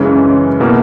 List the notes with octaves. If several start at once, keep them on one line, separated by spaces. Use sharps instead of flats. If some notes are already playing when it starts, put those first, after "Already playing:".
Already playing: F#2 C#3 E3 G#3 C#4
B2 A#3 E4